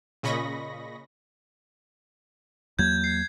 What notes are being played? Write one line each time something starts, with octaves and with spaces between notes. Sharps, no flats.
A#2 C#3 D#5 B5 C#6 A#6
E2 F#3 A#3 G6 G#6
C7